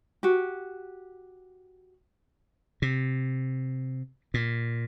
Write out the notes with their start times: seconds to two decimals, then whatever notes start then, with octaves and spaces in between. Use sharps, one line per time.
0.23 F#4 G4
2.82 C3
4.34 A#2